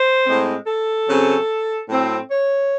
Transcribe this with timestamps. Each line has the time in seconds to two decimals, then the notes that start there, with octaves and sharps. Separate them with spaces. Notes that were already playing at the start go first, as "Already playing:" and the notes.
Already playing: C5
0.25 A2 G#3 C4
0.65 A4
1.07 C#3 F#3 C4
1.88 A2 F#3 C4
2.29 C#5